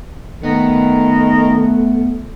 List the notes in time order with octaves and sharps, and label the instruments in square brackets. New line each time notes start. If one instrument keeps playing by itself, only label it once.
[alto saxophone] D#3 [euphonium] A3 [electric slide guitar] B3